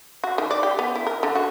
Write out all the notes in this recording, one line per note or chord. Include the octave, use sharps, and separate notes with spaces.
F#4
D#3
D5
G4
B3
E4
A#4
D3
F#4